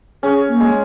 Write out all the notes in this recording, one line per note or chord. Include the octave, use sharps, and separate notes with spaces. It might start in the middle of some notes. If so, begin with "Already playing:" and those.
C#4 G#4
A#3
G#3